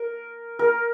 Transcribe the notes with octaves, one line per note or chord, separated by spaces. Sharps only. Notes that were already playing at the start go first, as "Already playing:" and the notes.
Already playing: A#4
A#4